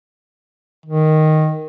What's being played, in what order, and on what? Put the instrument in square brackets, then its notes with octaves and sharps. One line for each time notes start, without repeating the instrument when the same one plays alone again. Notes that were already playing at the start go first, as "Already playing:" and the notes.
[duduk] D#3